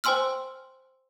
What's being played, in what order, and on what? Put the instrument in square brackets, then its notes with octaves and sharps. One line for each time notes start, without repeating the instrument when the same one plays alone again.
[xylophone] C5 G5 G#5 C6 E6 F6